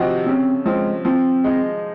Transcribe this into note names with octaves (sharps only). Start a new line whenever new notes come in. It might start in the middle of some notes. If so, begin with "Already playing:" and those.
Already playing: C3 F3 C4 D#4 F#4
C#3 C4
F3 G#3 C4
F3 C4
G#3 D#4